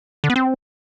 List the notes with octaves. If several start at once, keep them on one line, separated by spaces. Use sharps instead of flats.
D3
B3
C4